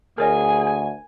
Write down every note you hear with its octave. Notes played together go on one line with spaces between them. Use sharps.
D2 G#4 A#4 C#5 D#5 G#5